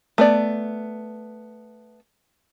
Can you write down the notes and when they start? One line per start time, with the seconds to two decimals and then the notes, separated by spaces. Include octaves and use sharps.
0.18 A3 B3 D5